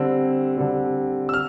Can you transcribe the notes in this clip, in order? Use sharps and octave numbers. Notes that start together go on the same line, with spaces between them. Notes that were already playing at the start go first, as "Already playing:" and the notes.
Already playing: D3 G3 C4 E6
D3 G3 C4
E6
F6